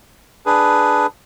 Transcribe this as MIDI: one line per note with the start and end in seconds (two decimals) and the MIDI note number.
0.46 1.06 62
0.46 1.06 68
0.46 1.06 71